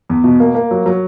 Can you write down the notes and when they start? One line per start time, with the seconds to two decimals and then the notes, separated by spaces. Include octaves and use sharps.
0.10 E2
0.24 B2
0.40 A#3
0.55 A#3
0.71 F#3
0.86 F#3